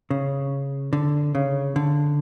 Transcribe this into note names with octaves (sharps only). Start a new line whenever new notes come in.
C#3
D3
C#3
D3